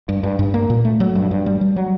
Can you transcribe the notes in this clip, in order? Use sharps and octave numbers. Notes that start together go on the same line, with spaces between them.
G2
G2
G2
A#3
A#2
A3
F#3
G2
G2
G3
G3
F#3